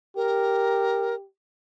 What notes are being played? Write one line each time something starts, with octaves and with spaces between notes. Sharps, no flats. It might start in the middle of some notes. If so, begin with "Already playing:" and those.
G4 A#4